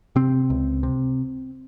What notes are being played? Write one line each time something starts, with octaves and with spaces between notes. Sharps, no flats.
C3 C4
C#2
C3